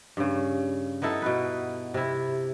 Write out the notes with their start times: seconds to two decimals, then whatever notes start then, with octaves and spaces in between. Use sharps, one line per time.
0.17 G2 C#3
1.02 B3 D#4 E4 A4
1.22 B2 B4
1.94 C3 E4